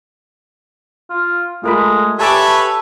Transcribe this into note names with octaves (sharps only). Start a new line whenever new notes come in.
F4
G#3 A3 F4 A#4 B5
G4 A4 B4 C#5 E5 G#5 A5 D6